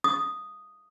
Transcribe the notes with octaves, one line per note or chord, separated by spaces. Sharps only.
D#6